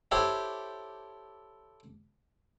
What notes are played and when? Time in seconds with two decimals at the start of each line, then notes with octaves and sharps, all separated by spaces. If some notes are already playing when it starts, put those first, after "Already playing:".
0.11 E4 G4 A4 C5 C#5